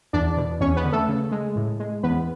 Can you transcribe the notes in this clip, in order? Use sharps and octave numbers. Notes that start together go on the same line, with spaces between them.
E2 D4 D5
B2
E2 C#4 C#5
B3 B4
D3
A3 A4
C#3
G#3
A2
G#3
E2 B3 B4